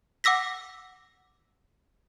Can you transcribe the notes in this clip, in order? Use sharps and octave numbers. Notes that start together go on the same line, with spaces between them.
F#5 D6 E6 A#6 B6